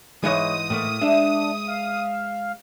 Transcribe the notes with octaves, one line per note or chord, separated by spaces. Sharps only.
G#2 E3 G#3 C#5 D#5 D#6
A2 A3 A#3
G#3 D4 E5
F5